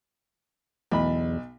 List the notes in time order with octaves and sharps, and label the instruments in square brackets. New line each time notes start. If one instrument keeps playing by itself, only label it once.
[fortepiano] B1 B5 [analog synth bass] E2